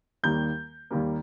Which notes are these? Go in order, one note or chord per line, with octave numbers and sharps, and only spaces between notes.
D#2 D#3 G3 A#3 G6
D#2 D#3 G3 A#3